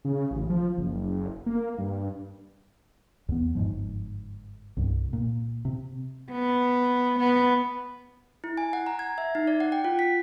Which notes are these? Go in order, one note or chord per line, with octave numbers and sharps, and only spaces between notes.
C#3
A1
F3
F#1
A#3
G2
E2 B3
G1 G#2 F3
C2 G2
A#2
C3
B3
B3
E4
G#5
F#5
A#5
G#6
E5
D#4
D5
F#5
G5
F4
B6